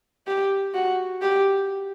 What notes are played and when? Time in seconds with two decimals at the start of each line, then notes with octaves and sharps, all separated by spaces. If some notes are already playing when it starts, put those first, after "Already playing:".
0.27 G4
0.74 F#4
1.21 G4